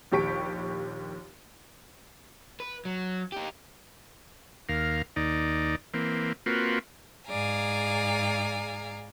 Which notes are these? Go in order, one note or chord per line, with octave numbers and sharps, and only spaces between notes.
A#1 D#2 G4 C#6 B6 D7
B4
F#3
D#4 G4
D#2 A#4 F5
D#2 D#4 D5
E3 A#3 C4
A#3 C4 F4 F#4 B4
G#2 G#4 D5 F5 G#5 A#5